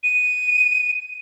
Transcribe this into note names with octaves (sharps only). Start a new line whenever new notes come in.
D#7